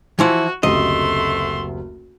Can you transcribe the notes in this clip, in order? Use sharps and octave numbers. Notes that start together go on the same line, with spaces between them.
E3 F3 E4 F#4
F#1 D2 C3 A3 D#5 C6